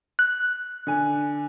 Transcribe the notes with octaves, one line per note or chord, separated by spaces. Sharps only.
F#6
D3 G#5